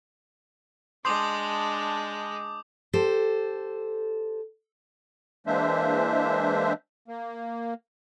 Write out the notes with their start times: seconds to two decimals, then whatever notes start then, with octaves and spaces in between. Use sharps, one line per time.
1.05 G#3 D4 A5 C6 D6 D#6 G6
2.93 G4 A4 C5
5.47 E3 G#3 A#3 D4 C5 E5
7.08 A#3